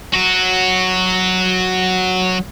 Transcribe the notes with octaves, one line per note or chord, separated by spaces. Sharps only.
F#3 F#4